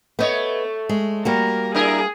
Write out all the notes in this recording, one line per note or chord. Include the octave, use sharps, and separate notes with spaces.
A3 B3 C5 C#5 D#5
G#3
G3 A#3 F#4 A#4
D4 E4 G#4 A#4